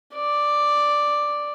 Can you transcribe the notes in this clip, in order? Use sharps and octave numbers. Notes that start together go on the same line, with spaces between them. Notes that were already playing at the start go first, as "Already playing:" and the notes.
D5